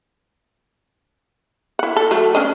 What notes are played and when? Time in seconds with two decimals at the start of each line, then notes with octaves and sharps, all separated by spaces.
1.79 E4 F#5
1.96 A4
2.11 F#3 A3
2.35 C#4 D4 D#5